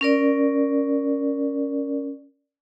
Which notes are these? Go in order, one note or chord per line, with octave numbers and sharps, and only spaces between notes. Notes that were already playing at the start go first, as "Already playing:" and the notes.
C#4 A#4 D5